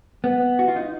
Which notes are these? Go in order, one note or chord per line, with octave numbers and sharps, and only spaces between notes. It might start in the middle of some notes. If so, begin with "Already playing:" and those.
B3
F#4
F4
D#4